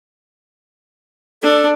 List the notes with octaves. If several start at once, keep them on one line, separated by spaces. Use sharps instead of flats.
D4 A4